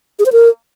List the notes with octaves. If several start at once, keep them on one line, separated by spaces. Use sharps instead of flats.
G#4
C5
A#4